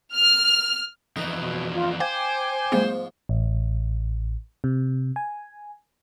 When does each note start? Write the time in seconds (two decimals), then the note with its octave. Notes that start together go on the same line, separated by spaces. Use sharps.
0.14 F6
1.17 F2 E3 D#4
1.39 B2
1.75 F4
2.00 C5 F5 G5 G#5 D6 G#6
2.72 G#2 F3 G3 A3 B3
3.29 A1
4.64 C3
5.16 G#5